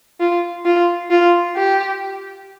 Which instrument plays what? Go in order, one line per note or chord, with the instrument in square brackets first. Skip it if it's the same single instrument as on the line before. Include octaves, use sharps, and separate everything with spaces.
[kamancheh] F4
F4
F4
G4